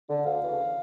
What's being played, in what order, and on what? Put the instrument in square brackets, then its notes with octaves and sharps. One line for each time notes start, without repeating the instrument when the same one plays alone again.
[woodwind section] D3
D2 F5
C#3 E3